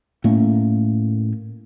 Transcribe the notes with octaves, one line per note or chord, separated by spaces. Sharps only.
A2 A3 A#3 C#4